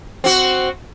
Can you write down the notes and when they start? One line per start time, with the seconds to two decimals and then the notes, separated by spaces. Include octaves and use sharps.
0.24 C4 F#4